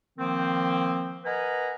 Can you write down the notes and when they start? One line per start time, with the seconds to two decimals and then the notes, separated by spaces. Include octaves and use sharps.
0.18 D#3 F3 A#3 C4
1.24 A#4 B4 D#5 F#5 G#5 A#5